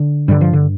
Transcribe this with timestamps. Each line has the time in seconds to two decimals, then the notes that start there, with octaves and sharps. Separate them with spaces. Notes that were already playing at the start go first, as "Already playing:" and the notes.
Already playing: D3
0.28 G2 D3 G3
0.41 F3
0.53 D3